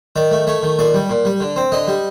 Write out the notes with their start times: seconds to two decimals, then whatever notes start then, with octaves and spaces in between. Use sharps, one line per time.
0.16 D#3 D5
0.31 A3
0.47 A3 C#5
0.63 D#3
0.79 A#2 D5
0.94 G3
1.10 A#2
1.25 G3
1.40 D3
1.56 C4
1.72 D3 D#5
1.88 G3